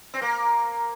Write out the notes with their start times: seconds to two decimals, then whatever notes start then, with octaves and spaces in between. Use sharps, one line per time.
0.14 C4
0.22 A#3